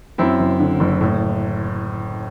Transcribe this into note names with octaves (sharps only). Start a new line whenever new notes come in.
F#2 C4 E4
F#1
D3
F#1
A2